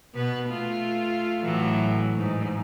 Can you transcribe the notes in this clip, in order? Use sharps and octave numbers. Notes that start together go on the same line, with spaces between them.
B2 B3 B4
A3 F4
A2 E3 F#3
G#2